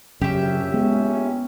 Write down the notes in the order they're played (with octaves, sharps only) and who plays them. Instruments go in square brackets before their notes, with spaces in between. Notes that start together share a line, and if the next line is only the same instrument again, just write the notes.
[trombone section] A#1 C#4 [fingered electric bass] F#2 C#3 [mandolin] G4 E5
[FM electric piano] G#3 [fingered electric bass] B3